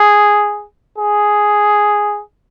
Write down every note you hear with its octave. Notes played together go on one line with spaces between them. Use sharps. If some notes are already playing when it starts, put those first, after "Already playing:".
Already playing: G#4
G#4